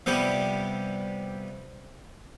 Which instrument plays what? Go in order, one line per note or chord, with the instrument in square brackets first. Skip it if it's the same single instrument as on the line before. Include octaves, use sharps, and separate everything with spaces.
[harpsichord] C3 F3 G3 B3 G4